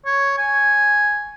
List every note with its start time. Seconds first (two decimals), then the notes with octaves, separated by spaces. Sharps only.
0.06 C#5
0.38 G#5